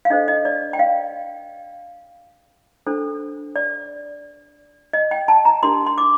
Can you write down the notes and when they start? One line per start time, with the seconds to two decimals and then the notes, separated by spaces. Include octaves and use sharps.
0.05 F5
0.10 D4 A4 C5 D#5
0.28 D#5
0.45 D5
0.73 G5
0.79 F5
2.87 D4 A4 C5
3.56 D5
4.93 D#5
5.11 G5
5.28 A5
5.45 A#5
5.63 D4 G4 A#4 C6
5.87 C6
5.98 D6